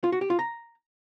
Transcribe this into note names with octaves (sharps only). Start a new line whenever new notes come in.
F4
F#4
G4
F4
A#5